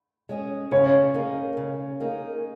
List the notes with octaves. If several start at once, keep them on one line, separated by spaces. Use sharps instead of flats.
G#3 C#4 G#4
C#3 C#4 C#5
A#3 D#4 G#4
C#3
A#3 D#4 G#4